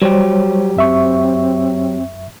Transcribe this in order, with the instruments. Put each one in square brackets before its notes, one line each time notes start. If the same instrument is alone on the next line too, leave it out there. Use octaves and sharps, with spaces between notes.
[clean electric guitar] F#3 G4 [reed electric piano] G3 C5 C#5 [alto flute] F#4
[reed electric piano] F#2 E5 C#6 [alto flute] C4